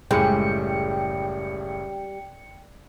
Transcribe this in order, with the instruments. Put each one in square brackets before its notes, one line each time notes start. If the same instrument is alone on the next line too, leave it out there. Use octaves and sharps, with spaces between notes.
[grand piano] F#1 A2 B5 [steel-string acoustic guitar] G3 [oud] G#3 [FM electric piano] G5 C#7